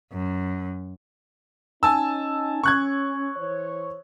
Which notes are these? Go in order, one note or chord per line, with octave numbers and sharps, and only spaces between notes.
F#2
C#4 D#4 G#5 A5 E6
C#4 C#6 F#6 G#6
E3 C5 C#5